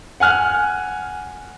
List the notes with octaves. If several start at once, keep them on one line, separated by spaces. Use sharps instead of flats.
F#5 G#5 F6 F#6